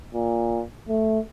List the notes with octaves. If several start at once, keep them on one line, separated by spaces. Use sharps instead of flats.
A#2
A3